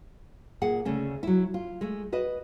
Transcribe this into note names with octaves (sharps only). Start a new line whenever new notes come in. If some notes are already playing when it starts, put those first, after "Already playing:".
A#2 G#4 F#5
D2 C#3 A3 C#4
F#3 E4
F4
G#3 A3
F#4 B4 D#5